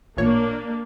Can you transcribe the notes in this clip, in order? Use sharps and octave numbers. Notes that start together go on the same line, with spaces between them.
A1 A#2 A#3 D4 C#5